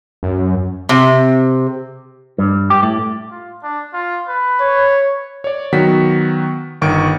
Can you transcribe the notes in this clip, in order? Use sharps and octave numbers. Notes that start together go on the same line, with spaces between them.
F#2
C3
G2
G4
A2
F4
D4
F4
B4
C#5
C#5 D5
D#3 F#3 B3 F#4 B6
G1 D#3 C#6 D7